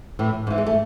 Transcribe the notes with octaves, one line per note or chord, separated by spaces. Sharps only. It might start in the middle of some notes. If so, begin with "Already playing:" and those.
A2 E3
G#2 E3
G#3
A3